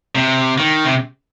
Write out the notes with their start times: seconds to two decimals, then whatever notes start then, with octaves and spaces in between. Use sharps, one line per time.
0.15 C3
0.58 D#3
0.85 C3